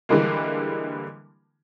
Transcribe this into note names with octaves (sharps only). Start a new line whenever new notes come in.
D3 E3 G3 G#3 A#3